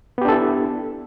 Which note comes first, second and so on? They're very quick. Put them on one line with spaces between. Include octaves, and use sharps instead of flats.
B3 G4 D4 A4 E4